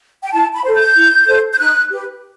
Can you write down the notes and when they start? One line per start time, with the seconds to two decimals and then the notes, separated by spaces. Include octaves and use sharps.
0.23 G5
0.32 E4 A5
0.53 B5
0.64 A4 C5
0.75 G6
0.96 E4
1.27 A4 C5
1.53 G6
1.59 D#4 F#6
1.91 G4 B4